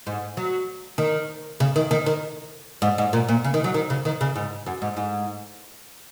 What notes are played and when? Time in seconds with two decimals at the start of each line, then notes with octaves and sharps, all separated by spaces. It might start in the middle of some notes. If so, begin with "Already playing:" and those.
0.07 G#2
0.37 F#3
0.98 D#3
1.60 C#3
1.76 D#3
1.91 D#3
2.06 D#3
2.82 G#2
2.98 G#2
3.13 A#2
3.29 A#2
3.44 C#3
3.54 D#3
3.64 F#3
3.74 D#3
3.90 C#3
4.05 D#3
4.21 C#3
4.36 G#2
4.66 F#2
4.82 G#2
4.97 G#2